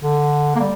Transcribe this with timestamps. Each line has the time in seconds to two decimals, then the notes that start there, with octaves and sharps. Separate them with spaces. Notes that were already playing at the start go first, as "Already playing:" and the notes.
0.02 D3
0.56 A#3
0.60 G3